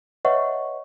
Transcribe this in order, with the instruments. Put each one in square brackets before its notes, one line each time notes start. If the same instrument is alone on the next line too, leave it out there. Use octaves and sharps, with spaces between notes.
[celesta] B4 C#5 D#5 E5 F#5 C#6